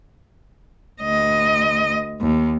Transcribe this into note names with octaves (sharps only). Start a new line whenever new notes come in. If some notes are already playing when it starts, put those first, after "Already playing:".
D2 D#5
D#2